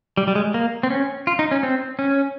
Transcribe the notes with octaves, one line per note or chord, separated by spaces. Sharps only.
G3
G3
G#3
A#3
C4
C#4
F4
D#4
C#4
C4
C#4